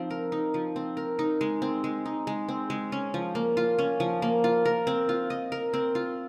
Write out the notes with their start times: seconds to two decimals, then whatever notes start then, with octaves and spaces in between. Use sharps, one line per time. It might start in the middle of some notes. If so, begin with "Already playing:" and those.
Already playing: F3 C4 D#4
0.10 A#4
0.32 D#4
0.54 F3
0.76 C4
0.97 A#4
1.19 D#4
1.41 G#3
1.62 C4
1.84 G#3
2.05 D#4
2.27 G#3
2.48 C4
2.70 G#3
2.92 C#4
3.14 F3
3.35 A#3
3.57 F4
3.79 C#4
4.00 F3
4.22 A#3
4.44 F4
4.65 A#4
4.87 C4
5.09 F4
5.30 D#5
5.52 A#4
5.74 C4
5.95 F4